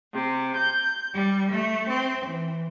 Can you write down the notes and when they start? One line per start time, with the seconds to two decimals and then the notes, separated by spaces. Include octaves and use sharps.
0.13 C3
0.55 G6
1.13 G3
1.51 A3
1.88 C4
2.24 E3